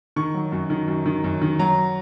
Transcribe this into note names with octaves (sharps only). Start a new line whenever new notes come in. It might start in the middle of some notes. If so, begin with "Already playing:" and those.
D#3 C#6
F#3
F#2
D#3
F#2
D#3
F#2
D#3
F#3 A#5